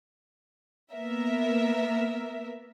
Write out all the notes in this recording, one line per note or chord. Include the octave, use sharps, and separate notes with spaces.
A#3 B3 A#4 E5